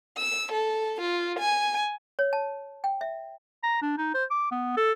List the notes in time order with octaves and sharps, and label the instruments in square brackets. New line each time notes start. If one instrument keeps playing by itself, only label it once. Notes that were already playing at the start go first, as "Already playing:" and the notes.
[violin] E6
A4
F4
G#5
[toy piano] C#5
A5
G5
E5
[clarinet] A#5
D4
D#4
C5
D6
B3
A4